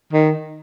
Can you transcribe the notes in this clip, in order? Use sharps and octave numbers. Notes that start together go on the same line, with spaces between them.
D#3